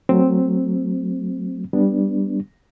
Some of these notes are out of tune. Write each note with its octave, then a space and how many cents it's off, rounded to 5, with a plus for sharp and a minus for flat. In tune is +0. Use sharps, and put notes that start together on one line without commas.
F#3 +0 A3 +25 C4 +0
G3 +0 B3 +0 D4 +0